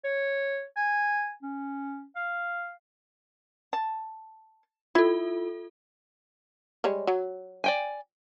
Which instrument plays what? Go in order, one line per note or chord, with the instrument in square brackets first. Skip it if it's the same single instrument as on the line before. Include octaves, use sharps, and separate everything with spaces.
[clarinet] C#5
G#5
C#4
F5
[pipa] A5
[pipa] E4 [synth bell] F4 A4
[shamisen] G3 G#3 C#5
F#3
[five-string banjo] D5 G5 G#5